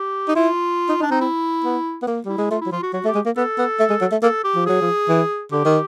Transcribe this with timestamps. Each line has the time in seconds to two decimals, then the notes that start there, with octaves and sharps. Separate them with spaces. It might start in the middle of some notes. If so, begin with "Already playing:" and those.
Already playing: G4
0.28 D#4
0.35 E4 F4
0.89 D#4
1.00 D4 D#4
1.10 C4 D#4
1.21 E4
1.64 B3
2.02 B3
2.07 A#3
2.25 G3 E4
2.38 G#3
2.51 A3 F4
2.61 E4
2.66 F#3
2.71 F3 F4
2.83 F#4
2.93 F#3 F#4
3.05 A3
3.08 G4
3.15 G#3
3.26 A#3
3.37 B3 A4
3.58 B3
3.80 A3
3.90 G#3
4.01 F#3
4.12 A3
4.22 A#3 A4
4.44 G4
4.55 F3
4.66 F#3 G#4
4.82 F3
5.09 E3
5.52 D3 G4
5.65 D#3